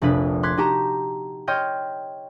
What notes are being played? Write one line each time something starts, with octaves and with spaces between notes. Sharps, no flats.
F1 A#1 D4 B4
C6 D6 F#6 G#6 B6 C7
D#4 F#4 G4 A5 A#5
C#5 D#5 G5 C6 F6 G6